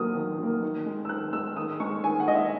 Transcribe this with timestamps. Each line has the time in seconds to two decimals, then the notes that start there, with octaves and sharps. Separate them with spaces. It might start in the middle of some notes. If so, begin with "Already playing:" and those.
Already playing: D#3 F#3 A#3 D#6
0.15 D#3
0.39 F#3 A#3
0.62 D#3
0.86 G#3
1.05 E6
1.09 D#3 F#6
1.33 G#3 E6
1.57 D#3 D#6
1.80 G#3 C#6
2.03 D#3 G#5
2.20 F#5
2.28 G#3 D#5
2.35 E5